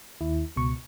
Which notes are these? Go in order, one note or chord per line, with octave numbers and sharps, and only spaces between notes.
D#2 E4
C#2 B2 C#6